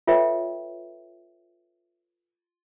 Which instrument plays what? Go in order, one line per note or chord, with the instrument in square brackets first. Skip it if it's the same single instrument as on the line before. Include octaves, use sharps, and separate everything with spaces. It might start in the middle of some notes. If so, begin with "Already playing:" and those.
[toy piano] F4 A4 B4 C#5 E5 G5